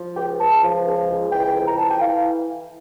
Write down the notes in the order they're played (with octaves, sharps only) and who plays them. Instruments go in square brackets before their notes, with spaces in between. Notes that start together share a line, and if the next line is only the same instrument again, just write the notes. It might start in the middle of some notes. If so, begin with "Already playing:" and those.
Already playing: [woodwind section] F3
C#2 G5
C#2 A5
F3
C#2
C#2
E3 G5
F2
A#5
E3 A5
G5
E3 F5